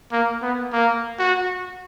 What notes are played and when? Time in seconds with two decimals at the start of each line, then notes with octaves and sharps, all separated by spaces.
0.12 A#3
0.42 B3
0.73 A#3
1.19 F#4